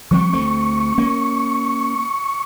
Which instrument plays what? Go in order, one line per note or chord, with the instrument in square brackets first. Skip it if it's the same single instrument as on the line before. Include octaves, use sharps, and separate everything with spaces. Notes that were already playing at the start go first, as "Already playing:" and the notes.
[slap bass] F3 G3 C4 [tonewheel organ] C#6
[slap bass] D2 A3 C4
A#3 C#4